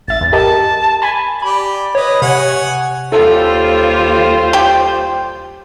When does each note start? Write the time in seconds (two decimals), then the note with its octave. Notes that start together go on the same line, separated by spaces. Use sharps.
0.08 G#1 E5 A6
0.21 E2
0.33 G4 A#4 D#5 A5
1.02 G#5 A5 B5
1.42 G4 D5 B5
1.95 B4 C#5 D#5
2.22 C3 C#5 F#5 G#5
3.12 D#2 G3 F4 A4 C5
4.53 G4 G5